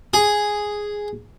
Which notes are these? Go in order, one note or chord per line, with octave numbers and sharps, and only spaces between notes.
G#4